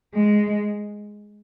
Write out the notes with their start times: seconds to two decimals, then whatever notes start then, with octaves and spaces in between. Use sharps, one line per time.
0.14 G#3